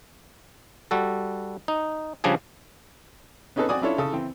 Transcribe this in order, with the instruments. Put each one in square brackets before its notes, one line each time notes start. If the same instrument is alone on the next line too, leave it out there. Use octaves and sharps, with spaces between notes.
[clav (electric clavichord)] G3 F#4 A4
D#4
C#3 F3 G3 D4 G#4
[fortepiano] B3 C#4 D#4 G#4 A4 B4
C4 F#4 D5 G#5 D#6
C#4 D4 E4 F4 A4 C#5
C#3 A4 D#6
E3 C4